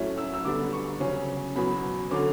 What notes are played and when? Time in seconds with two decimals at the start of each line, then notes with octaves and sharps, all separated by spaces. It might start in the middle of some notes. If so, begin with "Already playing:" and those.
Already playing: A2 F#3 A3 C#4
0.18 E6
0.34 E6
0.45 D3 G3 B3 D4 D6
0.73 C#6
1.00 C#3 F#3 C#4
1.55 E2 B2 F#3 B5
2.11 D3 F#3 C#4 D6